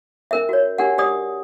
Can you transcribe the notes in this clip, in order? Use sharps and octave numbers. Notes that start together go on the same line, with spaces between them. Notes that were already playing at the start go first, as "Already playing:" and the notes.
C#4 A#4 E5
F#4 C#5
D4 G4 A#4 F#5
G4 D5 D#6